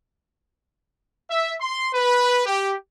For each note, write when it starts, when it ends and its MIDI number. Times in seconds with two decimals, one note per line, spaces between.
1.30 1.54 76
1.61 1.88 84
1.94 2.43 71
2.46 2.74 67